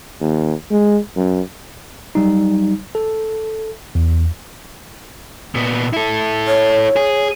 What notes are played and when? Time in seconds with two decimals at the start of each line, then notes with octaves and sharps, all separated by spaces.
0.21 D#2
0.71 G#3
1.17 F#2
2.15 F#3 G3 D#4
2.95 A4
3.95 E2
5.55 A#2 B3
5.93 E4 A4
6.47 C#5
6.96 G#4